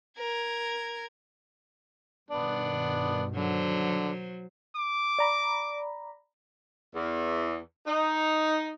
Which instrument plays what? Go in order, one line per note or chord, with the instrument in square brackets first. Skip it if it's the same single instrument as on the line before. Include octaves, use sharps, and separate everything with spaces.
[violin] A#4 G#6
[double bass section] G2 B2 D#3 [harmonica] B3 D4
[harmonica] D3 [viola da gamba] F#3 C5
[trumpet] D6
[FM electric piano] D5 A#5 B5
[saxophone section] E2
D#4